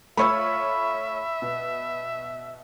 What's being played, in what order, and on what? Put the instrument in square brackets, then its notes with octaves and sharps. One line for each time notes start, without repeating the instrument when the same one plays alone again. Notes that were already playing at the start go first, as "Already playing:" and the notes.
[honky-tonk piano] A3 F4 C#5 [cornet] E5 [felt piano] B5 C#6 E6
[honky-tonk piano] B2